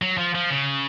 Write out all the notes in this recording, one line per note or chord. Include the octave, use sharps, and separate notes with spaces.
F#3
F3
F3
C#3